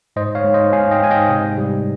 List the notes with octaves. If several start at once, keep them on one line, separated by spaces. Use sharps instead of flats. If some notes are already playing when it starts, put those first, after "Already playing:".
G#2 C5 D#5
C#5 F5
G#2
C5 D#5
G#2 F5 G#5
D#5 G5
G#2 G#5
D#5 G5
C3
G3